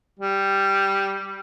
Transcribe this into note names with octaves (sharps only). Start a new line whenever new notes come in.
G3